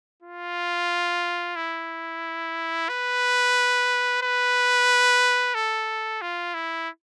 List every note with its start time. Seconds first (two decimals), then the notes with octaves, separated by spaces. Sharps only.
0.23 F4
1.56 E4
2.89 B4
4.22 B4
5.55 A4
6.22 F4
6.54 E4